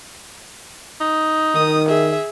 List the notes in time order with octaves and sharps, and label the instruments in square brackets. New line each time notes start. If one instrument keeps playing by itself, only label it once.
[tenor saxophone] D#4
[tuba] D#3 [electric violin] D#6
[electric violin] G#4 E5